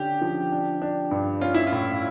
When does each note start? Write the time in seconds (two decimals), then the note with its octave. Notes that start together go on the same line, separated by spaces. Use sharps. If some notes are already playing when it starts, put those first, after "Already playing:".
Already playing: D3 C#4 G4
0.21 F3
0.52 D4
0.82 D4
1.11 G2
1.41 C#4 F4
1.55 E4
1.67 F4
1.72 A2